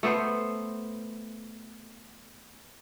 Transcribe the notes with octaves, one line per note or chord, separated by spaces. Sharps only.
A3 B3 C5